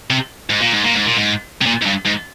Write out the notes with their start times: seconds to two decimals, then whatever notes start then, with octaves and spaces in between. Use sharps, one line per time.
0.10 C3
0.50 G#2
0.60 A#2
0.72 G#2
0.84 A#2
0.94 G#2
1.06 A#2
1.17 G#2
1.61 C3
1.66 A#2
1.82 G#2
1.85 G2
2.05 G#2